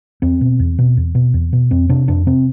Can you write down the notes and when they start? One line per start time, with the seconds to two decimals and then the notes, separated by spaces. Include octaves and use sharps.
0.22 E2 C4
0.41 B2
0.59 E2
0.79 B2
0.97 E2
1.15 B2
1.34 E2
1.53 B2
1.71 F2 C4
1.89 C3 D4
2.08 F2 D4
2.27 C3 C4